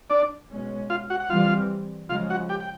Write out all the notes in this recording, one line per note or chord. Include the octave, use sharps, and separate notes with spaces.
D4 D5
B2 G#3 C#4
F4 F5
F#4 F#5
F#5
E3 G3 C4 F4 F5
C#3 F3 G#3 F4 F5
F#4 F#5
G4 G5
G5